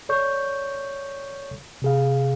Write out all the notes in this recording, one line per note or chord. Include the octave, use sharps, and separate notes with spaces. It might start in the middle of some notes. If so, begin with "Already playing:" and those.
A4 C#5 D5 C#6 G6
C3 G#4 F5